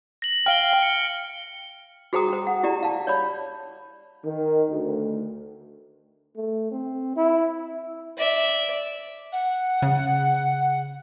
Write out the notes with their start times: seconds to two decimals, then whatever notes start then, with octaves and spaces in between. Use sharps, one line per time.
0.22 A#6 F#7
0.46 F5 G5 F6 D7 G7
0.83 C#7
2.13 F#4 G#4 C5 G5 A#5 D#6
2.28 C5 G5
2.47 F#5
2.63 E4 G4 D5 A#5
2.83 F5 A5
3.07 C#5 D5 B5
4.24 D#3
4.70 D2
6.37 A3
6.72 C4
7.16 E4
8.18 D5 E5
9.32 F#5
9.82 C#3